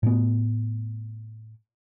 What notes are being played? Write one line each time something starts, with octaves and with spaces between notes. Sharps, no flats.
A2 B3